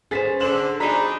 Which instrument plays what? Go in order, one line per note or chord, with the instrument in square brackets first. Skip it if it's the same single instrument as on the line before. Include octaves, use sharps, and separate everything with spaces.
[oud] C#4 B4 C5 [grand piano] G#4 A6 B6
[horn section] D3 [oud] C5 [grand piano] E7 F#7
[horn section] F3 D4 D#4 [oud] F#4 G#4 [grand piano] A#5 B5 B6